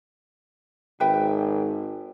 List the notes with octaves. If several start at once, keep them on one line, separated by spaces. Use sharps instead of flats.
G#1 B4 E5 G5